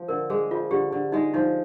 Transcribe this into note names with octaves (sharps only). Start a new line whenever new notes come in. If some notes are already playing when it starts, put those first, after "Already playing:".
Already playing: F3
D3 A#4
G#3 G#4
F3 F4
D3 G4
D3
G#3 D#4
F3 D#4